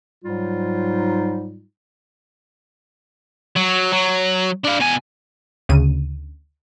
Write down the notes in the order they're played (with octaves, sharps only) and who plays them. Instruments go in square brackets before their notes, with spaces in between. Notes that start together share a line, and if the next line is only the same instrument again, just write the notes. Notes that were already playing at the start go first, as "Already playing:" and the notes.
[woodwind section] G#2 F#3 G3 D#4 F4
[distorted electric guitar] F#3
F#3
D4 F5
B2 G#5
[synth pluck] D2 C#3 D#7